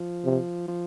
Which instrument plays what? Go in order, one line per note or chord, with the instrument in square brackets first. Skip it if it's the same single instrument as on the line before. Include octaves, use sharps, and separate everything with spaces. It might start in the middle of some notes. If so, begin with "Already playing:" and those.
Already playing: [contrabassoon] F3
[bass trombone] C3
[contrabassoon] F3